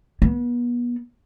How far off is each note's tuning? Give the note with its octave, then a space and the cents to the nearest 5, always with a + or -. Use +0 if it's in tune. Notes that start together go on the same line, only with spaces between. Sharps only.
B3 -35